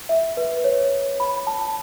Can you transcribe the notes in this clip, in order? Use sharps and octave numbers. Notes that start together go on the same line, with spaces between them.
E5
B4
C#5
B5
A5